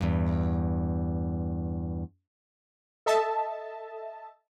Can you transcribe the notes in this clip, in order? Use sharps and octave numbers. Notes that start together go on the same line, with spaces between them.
E2 G2
A4 D#5 E5 A5